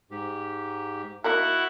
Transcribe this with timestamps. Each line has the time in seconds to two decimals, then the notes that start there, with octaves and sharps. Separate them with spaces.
0.11 G#2 G4
1.24 A#3 D#4 E4 F#4 A#4 F#5